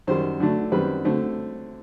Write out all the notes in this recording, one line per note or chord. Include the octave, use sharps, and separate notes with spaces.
F#2 D#3 G3 C5
D3 F#3 A3 D4
F#2 D#3 G3 C4 B4
D3 F#3 A3 C4